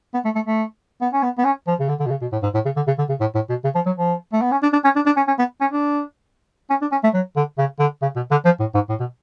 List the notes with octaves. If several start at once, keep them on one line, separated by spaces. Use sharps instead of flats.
B3
A3
A3
A3
B3
C#4
B3
B3
C#4
F3
C#3
D3
D3
B2
C#3
B2
A2
G#2
A2
C#3
D3
C#3
D3
C#3
A2
A2
B2
C#3
F3
F#3
F3
A3
B3
C#4
D4
D4
C#4
D4
D4
C#4
C#4
B3
C#4
D4
C#4
D4
C#4
A3
F#3
D3
C#3
D3
C#3
B2
D3
F3
A2
G#2
A2
B2